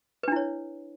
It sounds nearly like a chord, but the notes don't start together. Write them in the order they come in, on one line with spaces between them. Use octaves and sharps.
B4 D4 E4 C#5